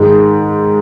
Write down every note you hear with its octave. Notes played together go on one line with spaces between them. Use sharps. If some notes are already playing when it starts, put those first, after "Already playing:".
Already playing: G#2 D#3 G#3